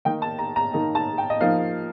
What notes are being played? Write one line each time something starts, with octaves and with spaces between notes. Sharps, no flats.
D#3 A#3 D#4 G5
A5
A#5
A#5
D#3 A#3 D#4
A5
G5
D#5
F3 A#3 D#4 F5